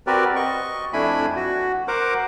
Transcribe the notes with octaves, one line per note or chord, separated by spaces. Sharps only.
C4 F#4 G4 A#4 B4 D5
D#5 C#6
F2 A3 D4 E4 G#5 B5
F#4
A#4 C5 F#5 D6